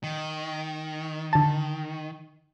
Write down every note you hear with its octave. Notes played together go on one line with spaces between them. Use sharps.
D#3
D3 A5